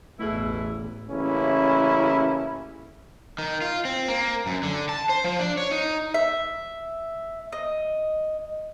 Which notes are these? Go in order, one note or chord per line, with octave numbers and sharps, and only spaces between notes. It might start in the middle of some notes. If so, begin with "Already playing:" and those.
A1 E2 B2 A3 E4 G#4
A1 C#3 A#3 C#4 E4
D#3
F4
C4
A#3
F#2
D3
A5
C5
F3
D4
C#5
D#4
E5
D#5